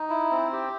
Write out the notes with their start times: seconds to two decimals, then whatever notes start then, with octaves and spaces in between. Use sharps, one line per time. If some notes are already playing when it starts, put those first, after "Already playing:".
Already playing: D#4
0.10 E4
0.31 C4
0.52 G4